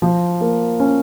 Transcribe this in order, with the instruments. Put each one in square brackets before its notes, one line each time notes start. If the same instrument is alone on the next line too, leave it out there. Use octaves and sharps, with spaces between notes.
[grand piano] F3
A#3
C#4